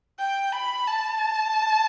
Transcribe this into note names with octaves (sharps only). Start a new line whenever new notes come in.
G5
B5
A5